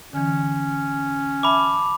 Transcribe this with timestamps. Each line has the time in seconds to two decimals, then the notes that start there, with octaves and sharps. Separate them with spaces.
0.13 D3 E3 C#4
1.43 E5 A5 B5 D6